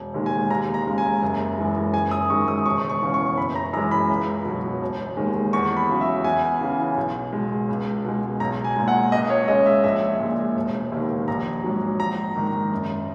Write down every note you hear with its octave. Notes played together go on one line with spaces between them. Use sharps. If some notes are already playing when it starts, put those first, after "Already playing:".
Already playing: E1
D#2 D#3 G#3
G#5
D#2 A#5
A#5
C#3 G#3
G#5
F#1
F#2 E3 G#3
F#1 G#5
D#6
F#2 D#3 G#3 C#6
D#6
E1 C#6
C#6
E2 C#3 E3
C#6
F#1 B5
A#5
F#2 E3 G#3 A#5
B5
C#2
B2 F#3
E1
D#2 D#3 G#3
E2 C#6
B5
C#3 F#3
E5
E2 G#5
C#3 E3
B1
B2 G#3
C#2
B2 G#3
B1 A#5
G#5
A#2 G#3
F#5
C#2 D#5
C#5
C#3 G#3 D#5
E5
A#1 E5
A#2 G#3
E1
D#2 D#3
A#1 A#5
G#2 F#3
A#1 A#5
G#2 D#3
F#1